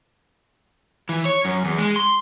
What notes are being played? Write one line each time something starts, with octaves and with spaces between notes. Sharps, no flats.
E3
C#5
F#2
E2
G#3
C6